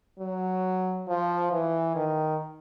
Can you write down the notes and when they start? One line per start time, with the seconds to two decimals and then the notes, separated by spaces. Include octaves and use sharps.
0.19 F#3
1.08 F3
1.52 E3
1.95 D#3